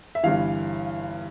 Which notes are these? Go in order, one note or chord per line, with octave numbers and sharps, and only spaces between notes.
E5
G1 G2 E3 F5